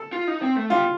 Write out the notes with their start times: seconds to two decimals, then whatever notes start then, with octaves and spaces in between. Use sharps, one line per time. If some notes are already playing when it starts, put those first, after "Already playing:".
Already playing: A4
0.13 F4
0.27 D#4
0.42 C4
0.56 A3
0.70 G3 F4